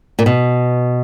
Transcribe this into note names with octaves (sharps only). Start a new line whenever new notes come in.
A#2
B2